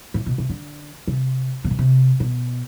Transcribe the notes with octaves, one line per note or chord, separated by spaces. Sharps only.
A2
B2
C3
D3
C3
C3
B2
C3
B2